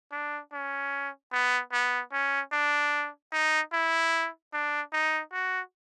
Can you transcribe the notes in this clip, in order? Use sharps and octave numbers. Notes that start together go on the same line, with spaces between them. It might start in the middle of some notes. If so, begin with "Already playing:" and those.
D4
C#4
B3
B3
C#4
D4
D#4
E4
D4
D#4
F#4